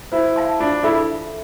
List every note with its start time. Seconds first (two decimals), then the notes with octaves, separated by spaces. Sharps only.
0.12 E4 C5
0.36 F5 A5 C6
0.60 D4 F4
0.83 E4 A4 E5 B5